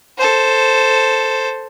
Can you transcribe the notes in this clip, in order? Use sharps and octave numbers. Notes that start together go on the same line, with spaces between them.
A4 C5